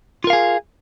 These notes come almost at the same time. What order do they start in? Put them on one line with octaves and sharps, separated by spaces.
F4 A#4 F5 G#4